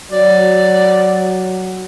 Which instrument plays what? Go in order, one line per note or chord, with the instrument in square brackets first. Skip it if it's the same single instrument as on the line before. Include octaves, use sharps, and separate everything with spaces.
[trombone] F#3 [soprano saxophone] D5